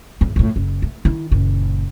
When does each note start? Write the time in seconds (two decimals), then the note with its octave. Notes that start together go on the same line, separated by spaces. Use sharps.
0.21 E2 A2
0.36 F2 A2
0.56 F#1
0.82 A3
1.05 D#3 E4
1.31 F#1 A#2